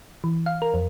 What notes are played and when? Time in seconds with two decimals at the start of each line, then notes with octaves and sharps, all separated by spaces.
0.24 E3
0.46 F5
0.62 A#4
0.74 F2